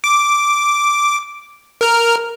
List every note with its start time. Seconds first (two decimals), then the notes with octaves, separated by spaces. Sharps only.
0.04 D6
1.81 A#4 F6